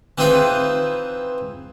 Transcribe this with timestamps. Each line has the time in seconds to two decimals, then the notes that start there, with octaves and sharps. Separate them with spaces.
0.18 E3 C4 D#4 F4 G#4 B4